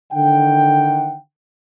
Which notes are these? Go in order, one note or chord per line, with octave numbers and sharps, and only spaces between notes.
D3 D#3 F#5 G5